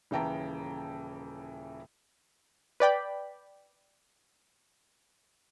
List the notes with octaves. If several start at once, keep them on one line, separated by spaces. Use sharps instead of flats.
D#1 C#3 E3 G5 A5 A#5
B4 D5 G5 B5